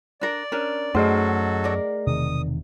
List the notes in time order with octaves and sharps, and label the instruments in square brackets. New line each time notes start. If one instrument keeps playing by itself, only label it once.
[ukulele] D4 A#4 [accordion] D5
[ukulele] C#4 D4 A#4
[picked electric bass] F#2 [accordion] F#3 F#4 A4 [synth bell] A3 G#4 D#5 [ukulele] C5
[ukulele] A#4 D5
[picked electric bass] E1 C3 D#3 [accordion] D#6